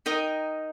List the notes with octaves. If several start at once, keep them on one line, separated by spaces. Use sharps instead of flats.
D#4 A#4 D#5 G5